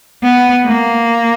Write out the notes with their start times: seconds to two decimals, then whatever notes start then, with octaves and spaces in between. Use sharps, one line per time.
0.23 B3
0.65 A#3